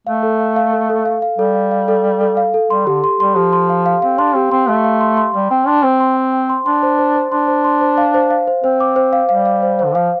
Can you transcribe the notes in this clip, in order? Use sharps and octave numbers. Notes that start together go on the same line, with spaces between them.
A3 F5
A4
F5
F5
A4
A4
F5
F5
G3 A4
F5
F5
A4
A4
A4
F5
A4
G3 C6
D3 G4
C6
G3 C6
F3 G4
C6
F5
F5
C4 F5
D4 C6
C4 G4
C4 C6
A3 F5
F5
C6
C6
G3 C6
C4 G5
D4 C6
C4 C5
C6
G5
G5
C6
D4 C6
C5
C5
C5
D4 C6
C5
C6
C5
F5
C5
F5
C5
C4 C5
D6
C5
F5
G3 F5
F5
C5
C5
D3
F3 F5